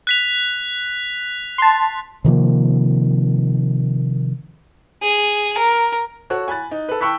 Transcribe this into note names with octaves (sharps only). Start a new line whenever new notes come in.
F#6 B6 F7
A5 C6
C3 D#3 F3 A#3
G#4
A#4
F#4 A4 C#5 F#6
G#5 B5 F#6 A6
D#4
A4 B4
G5 A5 C#6 E6 F#6 B6